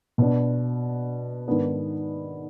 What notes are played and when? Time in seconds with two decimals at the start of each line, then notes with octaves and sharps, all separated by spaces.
0.18 B2 B3 D4
1.47 G#2 D#3 B3 D4